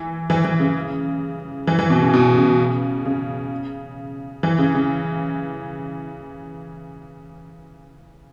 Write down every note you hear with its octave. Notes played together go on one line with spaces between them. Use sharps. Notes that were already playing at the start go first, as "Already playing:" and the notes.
Already playing: E3
E3
E3
C#3
E3
E3
B2
C#3
B2
C#3
C#3
E3
C#3
C#3